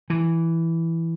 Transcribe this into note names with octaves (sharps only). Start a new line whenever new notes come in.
E3